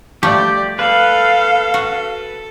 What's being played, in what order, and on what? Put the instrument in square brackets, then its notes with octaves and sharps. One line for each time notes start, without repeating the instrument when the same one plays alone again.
[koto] F3 G3 A3 [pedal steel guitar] G4 [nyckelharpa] D5
[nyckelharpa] A4 [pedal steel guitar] B4 [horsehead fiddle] F5
[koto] F#4